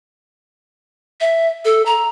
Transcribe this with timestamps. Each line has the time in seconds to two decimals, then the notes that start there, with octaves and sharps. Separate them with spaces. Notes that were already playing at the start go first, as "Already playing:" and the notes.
1.21 E5
1.65 A4
1.86 A#5